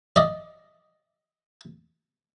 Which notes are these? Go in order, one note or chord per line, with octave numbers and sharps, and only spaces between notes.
D5 D#5